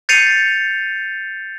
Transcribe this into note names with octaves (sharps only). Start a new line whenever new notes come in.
G6 A6 C7 C#7 D#7 F7